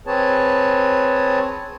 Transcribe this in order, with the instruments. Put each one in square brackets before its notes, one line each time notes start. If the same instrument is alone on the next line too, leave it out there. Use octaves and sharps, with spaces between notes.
[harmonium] C4 G#4 B4 C#5 A5